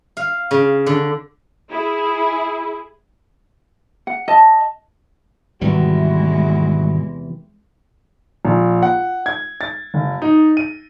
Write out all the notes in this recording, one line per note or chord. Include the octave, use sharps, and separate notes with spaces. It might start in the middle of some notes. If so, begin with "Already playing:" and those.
F5
C#3
D3
E4 G#4
F#5
D#5 A5
G#1 E2 C3 E3 G3 G#3 E4 F#4
A#1
F#5
G#6
A6
F#1
D#4
D#7